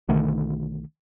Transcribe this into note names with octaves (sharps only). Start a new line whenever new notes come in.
B1 D3 D#3 A3